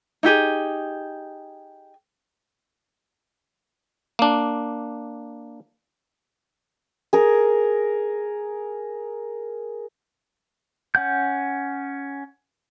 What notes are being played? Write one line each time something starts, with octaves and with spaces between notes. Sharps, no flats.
D#4 E4 G4 G#4
A#3 D4
G#4 A#4
C#4 F#5 G6